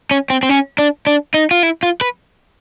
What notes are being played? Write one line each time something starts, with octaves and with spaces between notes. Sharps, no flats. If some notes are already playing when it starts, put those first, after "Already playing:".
C#4
C4
C4
C#4
D4
D4
D#4
F4
E4
F4
B4